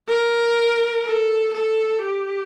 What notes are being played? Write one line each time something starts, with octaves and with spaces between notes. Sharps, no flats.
A#4
A4
A4
G4